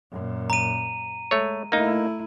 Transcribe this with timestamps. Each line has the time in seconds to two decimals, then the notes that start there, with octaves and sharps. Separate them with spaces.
0.11 F#2 A#2
0.50 A#5 D#7
1.31 G#3 A3 C#5
1.72 A3 A#3 D#4 E4